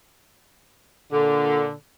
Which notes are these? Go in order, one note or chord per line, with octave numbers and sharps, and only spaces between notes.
A#2 D3